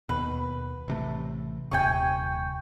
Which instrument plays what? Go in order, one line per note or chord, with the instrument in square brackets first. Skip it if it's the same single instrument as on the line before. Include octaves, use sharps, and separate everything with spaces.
[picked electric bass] D#2 B2 [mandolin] B4
[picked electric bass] A1 C3 A3
[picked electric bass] D#1 D#2 C3 [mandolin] G5 G#5 C#6